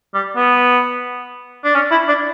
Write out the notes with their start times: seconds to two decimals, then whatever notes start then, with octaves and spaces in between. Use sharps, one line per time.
0.14 G3
0.36 B3
1.64 D4
1.75 C#4
1.91 E4
2.08 D4